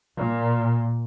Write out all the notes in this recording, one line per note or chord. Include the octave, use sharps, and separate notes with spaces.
A#2